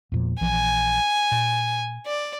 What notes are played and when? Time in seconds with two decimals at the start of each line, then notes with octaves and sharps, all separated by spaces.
0.12 E2 A#2 F3
0.41 A#1 E3 F3 G#5
1.32 A#2
2.06 D5